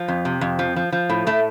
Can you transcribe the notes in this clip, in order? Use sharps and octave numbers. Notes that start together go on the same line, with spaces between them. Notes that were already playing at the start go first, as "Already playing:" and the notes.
Already playing: F3
F2
C3
F2
F3
F3
F3
A2
A2 A3